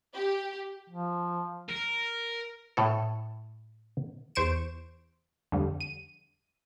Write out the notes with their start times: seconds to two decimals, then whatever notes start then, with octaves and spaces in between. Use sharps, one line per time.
0.14 G4
0.89 F3
1.69 A#4
2.77 A2 A4
4.35 E2 C5 C#6 D7 E7
5.52 F2 D3 G3
5.81 D#7